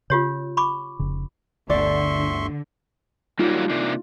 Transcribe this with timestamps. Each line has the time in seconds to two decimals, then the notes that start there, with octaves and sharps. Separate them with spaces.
0.10 C#3 F4 G4 C#5
0.57 B5 C#6 D6
0.99 F1 C#3
1.70 G1 D2 D3 D5 E5 C6 C#6
3.39 F#3 G3 A#3 D#4 F4
3.70 C3 A#3 D4